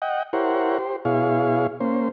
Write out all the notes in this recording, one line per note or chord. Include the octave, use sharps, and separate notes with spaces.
D#5 F#5 G5
E4 G4 A#4 C5 C#5 F#5
G4 C5
B2 E4 G#4 C#5 F5
A#3 C#4 C5